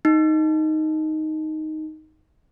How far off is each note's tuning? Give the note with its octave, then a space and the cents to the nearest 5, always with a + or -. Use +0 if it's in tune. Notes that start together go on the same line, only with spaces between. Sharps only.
D#4 +0